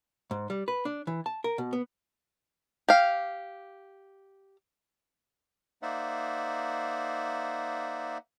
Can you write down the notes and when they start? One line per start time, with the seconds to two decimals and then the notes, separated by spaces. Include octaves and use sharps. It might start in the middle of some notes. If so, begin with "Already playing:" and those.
0.31 G#2
0.50 G3
0.68 B4
0.85 D4
1.07 E3
1.26 A5
1.44 A#4
1.58 B2
1.73 B3
2.89 G4 F5
5.82 A#3 D#4 C5 D5 E5 F#5